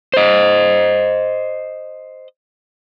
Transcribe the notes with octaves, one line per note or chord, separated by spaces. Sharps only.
C5 D#5